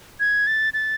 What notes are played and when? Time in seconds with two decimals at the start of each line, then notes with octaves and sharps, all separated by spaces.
0.20 G#6
0.47 A6
0.74 A6